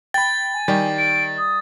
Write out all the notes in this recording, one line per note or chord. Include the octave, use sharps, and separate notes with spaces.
G5 B5 A6
G#5
D#3 G3
D7
D#6